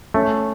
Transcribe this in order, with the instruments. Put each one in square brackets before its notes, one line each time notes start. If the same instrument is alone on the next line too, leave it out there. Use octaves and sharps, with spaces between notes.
[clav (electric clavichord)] A3 [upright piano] C#4